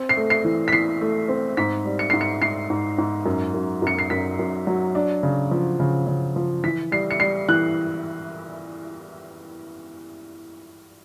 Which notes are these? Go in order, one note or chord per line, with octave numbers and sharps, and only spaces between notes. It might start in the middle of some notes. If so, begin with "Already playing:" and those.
Already playing: C4
C7
A3
C7
E3
B6
E3 C7
A3
C4
G#2 B6
G3
C#7
G#2 C7
C#7
G#2 C7
G#2
G#2
F#2
F#2
F#2 C#7
C7
F#2 B6
F#2
F#3
D4
C#3
F3
C#3
C#3
F3
E3 B6
G3 C7
C#7
G3 C7
E3 F#6